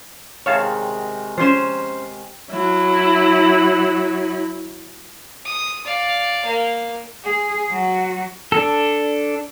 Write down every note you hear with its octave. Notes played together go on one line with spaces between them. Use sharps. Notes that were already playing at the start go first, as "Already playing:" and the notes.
C3 D#3 G#3 C#5 F5 A5
F3 C#4 C5 C6 E7
F#3 E4
D#6
D5 F5
A#3
G#4
F#3 F#4
D4 A4